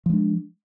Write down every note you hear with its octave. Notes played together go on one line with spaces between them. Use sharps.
F3 G#3 D4